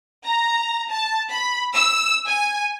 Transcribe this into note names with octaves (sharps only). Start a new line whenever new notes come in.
A#5
A5
B5
E6
G#5